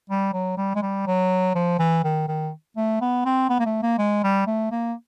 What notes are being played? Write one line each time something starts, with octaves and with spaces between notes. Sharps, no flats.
G3
F#3
G3
G#3
G3
F#3
F3
E3
D#3
D#3
A3
B3
C4
B3
A#3
A3
A#3
G#3
G3
A3
A#3